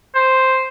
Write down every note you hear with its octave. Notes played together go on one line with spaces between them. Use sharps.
C5